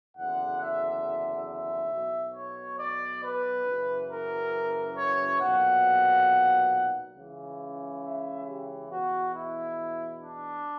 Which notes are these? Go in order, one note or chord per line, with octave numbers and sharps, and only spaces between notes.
F#1 E2 D3 F#5
E5
E5
B1 B2
C#5
D5
B4
F#1 F#2 E3
A#4
C#5
B1 A#2 F#5
C#2 C#3 E3
E5
G4
E2 B2 F#4
E4
D4